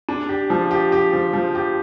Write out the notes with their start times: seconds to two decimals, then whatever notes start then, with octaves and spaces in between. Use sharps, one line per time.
0.09 D4
0.29 G4
0.50 F3
0.71 G4
0.92 G4
1.13 F3
1.34 F3
1.55 G4